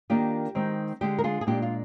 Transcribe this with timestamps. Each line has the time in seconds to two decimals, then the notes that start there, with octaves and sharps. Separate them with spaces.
0.10 D#3 A#3 D4 F4 G4
0.55 D#3 G#3 C4 D#4
1.01 D3 G#3 D4 G4
1.18 A#4
1.24 F4 G#4
1.41 G#4
1.47 A#2 G#3 D4 F4 G4
1.62 F4